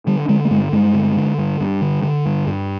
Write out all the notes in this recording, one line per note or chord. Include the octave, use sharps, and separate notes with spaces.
D3 G3
D3 G#3
A3
G2 G#3
G2 G#3
D3
D3
G2
G2
D3
D3
G2
G2